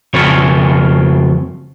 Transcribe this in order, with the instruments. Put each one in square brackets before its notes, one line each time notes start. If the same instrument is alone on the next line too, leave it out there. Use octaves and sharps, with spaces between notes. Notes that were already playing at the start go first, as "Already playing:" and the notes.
[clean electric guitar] F2 C#3 F4 C#5